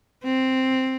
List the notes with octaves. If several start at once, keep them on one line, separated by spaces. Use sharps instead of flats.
C4